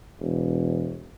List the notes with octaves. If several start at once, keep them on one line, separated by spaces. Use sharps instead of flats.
E1